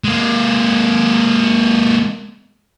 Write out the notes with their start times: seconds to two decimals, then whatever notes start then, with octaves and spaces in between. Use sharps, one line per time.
0.04 G#3 A#3